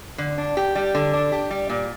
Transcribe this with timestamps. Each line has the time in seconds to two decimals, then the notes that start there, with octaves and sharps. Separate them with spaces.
0.18 D3
0.38 D4
0.57 G4
0.75 G3
0.95 D3
1.13 D4
1.32 G4
1.51 G3
1.69 A#2